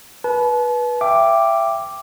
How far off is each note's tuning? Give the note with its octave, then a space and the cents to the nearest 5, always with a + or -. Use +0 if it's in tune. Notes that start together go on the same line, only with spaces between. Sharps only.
B4 -20 A5 -40
E5 +25 G5 +0 D6 +0